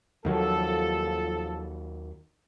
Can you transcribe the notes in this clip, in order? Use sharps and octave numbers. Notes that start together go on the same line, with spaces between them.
D#2 D#3 F3 F#3 A4